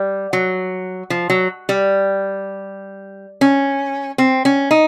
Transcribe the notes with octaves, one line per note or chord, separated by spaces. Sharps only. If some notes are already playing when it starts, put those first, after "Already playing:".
Already playing: G3
F#3
F3
F#3
G3
C#4
C4
C#4
D#4